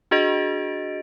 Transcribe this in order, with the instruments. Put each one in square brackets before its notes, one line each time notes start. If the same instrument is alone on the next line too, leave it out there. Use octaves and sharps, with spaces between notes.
[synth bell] D4 F#4 G#4 D#5 A6 D7